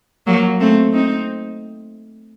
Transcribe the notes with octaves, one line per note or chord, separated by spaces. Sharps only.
F#3 A#3
A3 C4
C4 D#4